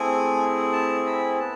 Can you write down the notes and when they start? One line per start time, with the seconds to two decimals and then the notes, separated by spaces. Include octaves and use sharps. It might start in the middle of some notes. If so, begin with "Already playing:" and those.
Already playing: A3 C4 E4 G#4 G#5
0.73 A5
1.06 B5
1.39 B3 A5